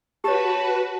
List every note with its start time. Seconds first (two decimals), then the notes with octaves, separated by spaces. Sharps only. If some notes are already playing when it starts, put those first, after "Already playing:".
0.24 F#4 G4 B4 C#5 A5